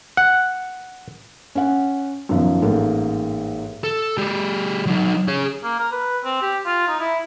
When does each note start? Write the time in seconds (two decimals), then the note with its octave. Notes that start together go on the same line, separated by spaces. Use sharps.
0.17 F#5
1.55 C#4 F#5
2.29 F#2 B2 D#3 F3
2.62 A1 G#2 A#3 A4
3.84 A4
4.18 G#3 G4
4.87 F#3 D#4
5.28 G#4 C#5
5.64 A#3
5.79 A#4
5.92 B4
6.24 C4
6.42 G4
6.66 F4
6.88 D#4
7.00 E4